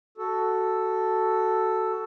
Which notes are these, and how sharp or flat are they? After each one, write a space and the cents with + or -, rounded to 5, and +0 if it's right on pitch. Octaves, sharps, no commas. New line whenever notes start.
F#4 +10 A4 +0